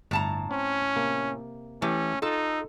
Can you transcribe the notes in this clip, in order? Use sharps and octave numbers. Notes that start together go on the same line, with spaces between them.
G1 A2 A5 A#5
C4 C#4
C3 A#3
E3 A3 C#4 G4
D#4 F4 A4